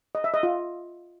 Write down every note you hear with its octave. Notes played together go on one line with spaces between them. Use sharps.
D#5
E5
D#5
F4